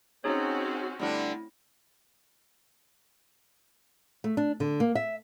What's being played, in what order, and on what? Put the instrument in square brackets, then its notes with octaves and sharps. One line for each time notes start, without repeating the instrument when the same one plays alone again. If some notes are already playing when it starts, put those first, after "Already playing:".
[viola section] C4 C#4 F#4 [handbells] D#4 G#4 C#5
[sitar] D3 G3 D4 [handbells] A3 E4
[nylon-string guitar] A3
D4
D3
A#3
E5